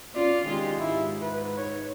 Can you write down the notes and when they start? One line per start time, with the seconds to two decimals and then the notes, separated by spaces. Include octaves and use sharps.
0.15 C#4 F4 D5
0.46 D#3 G#3 F4 G4
0.80 G#2 E4
1.22 B4
1.58 C#5